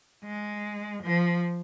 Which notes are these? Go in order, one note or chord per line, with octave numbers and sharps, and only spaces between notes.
G#3
F3